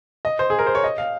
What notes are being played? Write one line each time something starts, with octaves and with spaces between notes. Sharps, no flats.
D#5
C5
G#4
A#4
C5
C#5
D#5
F5